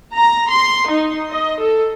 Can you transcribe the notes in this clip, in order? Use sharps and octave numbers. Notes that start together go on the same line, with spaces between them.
A#5
C6
D#4
D#5
A4